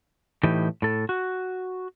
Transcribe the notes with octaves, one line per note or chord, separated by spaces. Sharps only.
A2 E3 D#4 G4
A2 A4
F#4